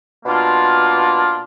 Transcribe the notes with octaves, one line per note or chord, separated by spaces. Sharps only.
B2 A#3 D4 F4